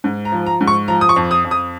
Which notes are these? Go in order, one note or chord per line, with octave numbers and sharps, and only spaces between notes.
G#2
A#5
F3
A#5
G#2
C#6
F3 A#5
D#6
C#6
F2
D#6
F2
D#6